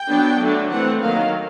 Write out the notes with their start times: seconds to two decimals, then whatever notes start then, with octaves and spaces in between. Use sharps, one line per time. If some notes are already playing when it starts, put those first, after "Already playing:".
Already playing: G5
0.09 F#3 B3 D4
0.41 D3 F#3 A3 D4
0.71 E3 A3 C4 F#5
1.02 D#3 F#3 A#3 F5